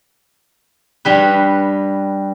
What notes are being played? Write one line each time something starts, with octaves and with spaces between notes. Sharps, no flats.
G2 G3 B4